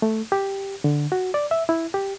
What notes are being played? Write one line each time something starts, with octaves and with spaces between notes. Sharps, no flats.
A3
G4
D3
F#4
D5
E5
E4
G4